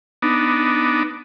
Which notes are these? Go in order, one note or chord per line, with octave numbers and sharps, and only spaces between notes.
B3 D4 D#4